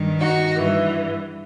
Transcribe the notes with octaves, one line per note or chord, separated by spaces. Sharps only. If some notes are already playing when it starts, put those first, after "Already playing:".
Already playing: G2 D#3
D#4 F#4
G2 E3